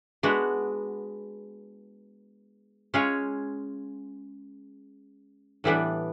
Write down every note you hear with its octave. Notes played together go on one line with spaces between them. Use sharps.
G#3 B3 D4 F#4
G#3 C#4 F4 G#4 C#5
A2 E3 G3 B3 D4